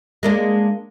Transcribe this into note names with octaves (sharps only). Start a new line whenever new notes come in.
G#3 A#3 D4